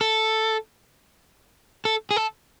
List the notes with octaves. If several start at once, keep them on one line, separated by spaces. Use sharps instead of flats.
A4
A4
G#4
A4